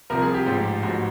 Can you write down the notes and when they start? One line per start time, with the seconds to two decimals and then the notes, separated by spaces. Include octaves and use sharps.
0.10 C2 C3 F3 A#4
0.22 G#4
0.34 G4
0.46 A1 G#2 F3
0.83 A1 G#2 F3 F#4